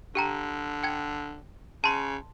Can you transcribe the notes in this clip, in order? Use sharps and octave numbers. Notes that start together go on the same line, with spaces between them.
D3 G4 G5 A#5
G5 G#6
C#3 A5 C6